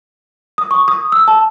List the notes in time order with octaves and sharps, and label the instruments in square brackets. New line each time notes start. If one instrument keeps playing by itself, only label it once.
[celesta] D#6
C#6
D#6
E6
A5